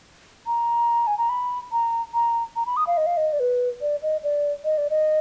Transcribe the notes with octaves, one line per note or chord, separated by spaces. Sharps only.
A#5
G#5
A#5
B5
A#5
A#5
A#5
B5
D#6
F5
D#5
F5
D#5
D5
B4
D5
D#5
D5
D#5
D5
D#5